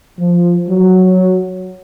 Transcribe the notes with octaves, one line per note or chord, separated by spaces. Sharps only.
F3
F#3